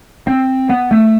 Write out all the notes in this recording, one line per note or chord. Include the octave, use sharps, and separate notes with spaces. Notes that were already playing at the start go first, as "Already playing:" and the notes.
C4
B3
A3